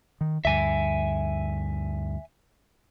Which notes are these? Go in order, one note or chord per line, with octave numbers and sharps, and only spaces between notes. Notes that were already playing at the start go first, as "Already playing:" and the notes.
D#3
D2 G2 E5 G#5